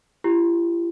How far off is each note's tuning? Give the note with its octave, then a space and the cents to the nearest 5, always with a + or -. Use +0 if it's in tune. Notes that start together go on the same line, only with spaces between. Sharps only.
E4 +45 G4 +0